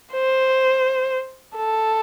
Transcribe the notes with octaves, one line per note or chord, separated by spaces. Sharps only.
C5
A4